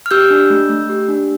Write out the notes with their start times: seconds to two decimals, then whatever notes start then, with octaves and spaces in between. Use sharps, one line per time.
0.06 F6
0.11 G4 E6 G6
0.31 D4
0.50 A3
0.69 A3
0.89 G4
1.09 D4